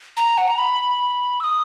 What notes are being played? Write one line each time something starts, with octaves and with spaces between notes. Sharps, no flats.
A#5
F#5
A#5
B5
E6
D#6